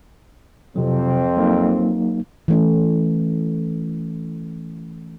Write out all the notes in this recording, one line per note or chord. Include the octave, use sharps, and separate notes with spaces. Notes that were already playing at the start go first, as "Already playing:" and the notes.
F2 C3 F#3 C4
F#3 A#3 D#4
E3 A3 C#4